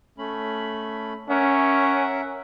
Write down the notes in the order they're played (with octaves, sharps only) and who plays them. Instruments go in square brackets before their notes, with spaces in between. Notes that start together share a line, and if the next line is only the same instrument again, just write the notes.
[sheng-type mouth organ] A3 C#4 B5
[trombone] C#4 [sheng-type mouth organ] A#4 E5 F#5